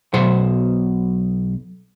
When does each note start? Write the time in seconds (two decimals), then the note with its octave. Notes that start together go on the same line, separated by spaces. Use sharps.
0.14 B1 B2 F#3 C5 F#5 C6